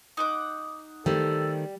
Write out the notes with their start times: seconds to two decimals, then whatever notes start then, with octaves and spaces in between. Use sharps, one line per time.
0.17 D#4 F#5 D6
1.06 D#3 G3 A3 C4 A4